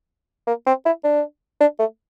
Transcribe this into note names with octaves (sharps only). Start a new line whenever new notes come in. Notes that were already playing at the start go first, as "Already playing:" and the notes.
A#3
C4
E4
D4
D4
A3